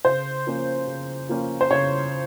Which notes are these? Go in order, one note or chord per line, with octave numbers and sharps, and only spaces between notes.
C#3 C5
F3 A#3 C#4
C#3
F3 A#3 C#4
C5
C#3 C#5